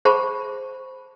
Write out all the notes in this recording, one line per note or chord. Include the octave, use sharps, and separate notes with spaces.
G#4 C5 F#5 A5 B5 C#6